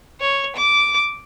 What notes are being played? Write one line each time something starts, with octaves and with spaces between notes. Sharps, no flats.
C#5
D6